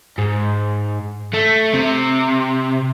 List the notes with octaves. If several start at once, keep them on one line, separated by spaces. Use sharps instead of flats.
G#2
A3
C3